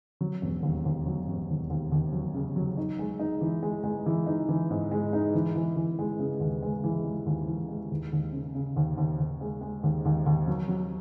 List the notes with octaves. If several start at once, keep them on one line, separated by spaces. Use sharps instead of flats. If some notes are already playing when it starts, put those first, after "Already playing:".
F#3
E1
D#2
D#2
F#3
E1
D#2
D#2
D#2
F#3
C#3
F#3
D#4
G#3
D#4
E3
G#3
G#3
E3
D#4
E3
G#2
G#3
D#4
E3
E3
E3
G#3
C#3
D#2
G#3
E3
G#3
D#2
E3
G#3
D#2
D#2
C#3
C#3
D#2
D#2
D#2
G#3
G#3
D#2
D#2
D#2
F#3
F#3